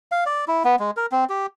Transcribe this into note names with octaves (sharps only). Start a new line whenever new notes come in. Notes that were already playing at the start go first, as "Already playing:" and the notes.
F5
D5
E4
B3
G#3
A#4
C4
G4